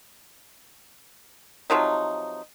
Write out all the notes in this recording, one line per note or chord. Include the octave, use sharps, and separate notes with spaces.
C3 F3 F#3 D#4